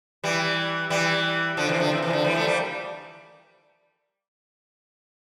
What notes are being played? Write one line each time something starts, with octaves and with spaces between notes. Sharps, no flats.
E3 G3
E3 G3
D3 F3
C3 E3
D3 F3
C3 E3
C3 E3
D3 F3
E3 G3
F3 A3
G3 A#3